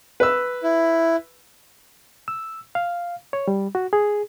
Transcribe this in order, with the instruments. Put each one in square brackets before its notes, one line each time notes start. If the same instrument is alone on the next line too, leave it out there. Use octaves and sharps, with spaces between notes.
[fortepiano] B4 E6
[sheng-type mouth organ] E4
[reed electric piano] E6
F5
C#5
G3
F#4
G#4